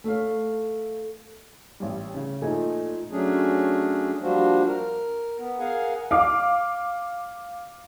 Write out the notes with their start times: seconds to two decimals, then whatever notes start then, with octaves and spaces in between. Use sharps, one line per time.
0.04 A3 A4 C#5 F5
1.80 A1 G3
2.14 C#3
2.41 A#2 F3 A3 D#4 G#5
3.11 F#3 A3 C#4 D4 G#4
4.22 F3 G3 A#3 D4 F#4 C5
4.68 A#4
5.39 B3
5.59 G#4 A#4 F5 F#5 G#5
6.11 F5 D6